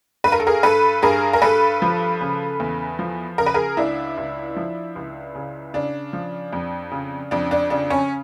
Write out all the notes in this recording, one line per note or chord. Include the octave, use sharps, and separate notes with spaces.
G2 B4
A#4
A4
G#4 A#4
G2 A4 B4
G2 G#4 A#4
A#4
G2 A4 B4
F3
C#3
E2
F3
C#3 A#4
B4
G#4 A#4
C#2 D4 E4
C#2
F3
C#2
C#3
C#3 D4
F3
F2
C#3
F2 D4
D4
C#3 D4
C#4